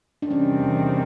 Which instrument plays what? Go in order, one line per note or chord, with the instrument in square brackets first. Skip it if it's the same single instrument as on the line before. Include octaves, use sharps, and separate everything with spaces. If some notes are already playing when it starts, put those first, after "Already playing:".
[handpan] D4
[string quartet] E2 C3 D#3 G3 C4 [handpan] C#4